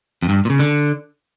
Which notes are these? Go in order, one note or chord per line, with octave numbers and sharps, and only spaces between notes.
F2
G2
A#2
C#3
D3